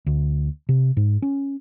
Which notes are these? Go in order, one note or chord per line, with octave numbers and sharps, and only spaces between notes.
D2
C3
G#2
C#4